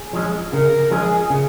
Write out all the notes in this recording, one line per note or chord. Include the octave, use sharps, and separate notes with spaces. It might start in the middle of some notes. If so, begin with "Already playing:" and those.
Already playing: G#4
F3 G#3 C#4
C#3 A#4
F3 G#3 C#4 G#4
C#3